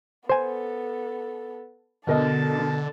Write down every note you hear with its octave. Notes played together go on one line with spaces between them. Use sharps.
B3 A4 C5 G#5
B2 D3 A4 A#4 D#5 A5